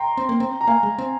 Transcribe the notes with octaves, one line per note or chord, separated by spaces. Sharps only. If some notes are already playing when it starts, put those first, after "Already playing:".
Already playing: G5 A#5 C6
C4
A#3
C4
A#5
A#3 F5 G#5
G#3
C4